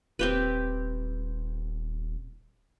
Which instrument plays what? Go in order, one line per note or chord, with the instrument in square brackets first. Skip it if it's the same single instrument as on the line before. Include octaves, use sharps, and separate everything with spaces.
[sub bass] D#1 [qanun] C4 G4 B4